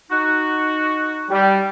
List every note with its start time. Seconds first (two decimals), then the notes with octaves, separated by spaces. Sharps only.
0.11 D#4 F#4
1.30 G3